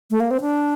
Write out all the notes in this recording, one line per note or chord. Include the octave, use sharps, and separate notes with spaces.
A3
A#3
C4
D4